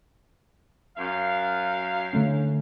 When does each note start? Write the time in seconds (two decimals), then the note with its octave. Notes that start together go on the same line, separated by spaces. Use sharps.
0.97 F#2 F5
2.13 D3 A3 C#4